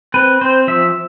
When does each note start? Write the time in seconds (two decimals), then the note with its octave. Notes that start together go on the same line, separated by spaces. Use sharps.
0.14 C4 B4
0.41 C4 C5
0.67 F3 E5